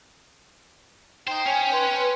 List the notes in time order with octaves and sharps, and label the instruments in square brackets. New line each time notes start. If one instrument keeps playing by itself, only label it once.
[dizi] D#4 [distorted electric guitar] C5 [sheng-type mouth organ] G5
[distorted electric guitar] C#4 [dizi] C#5 [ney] G#5
[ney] B4 [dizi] C6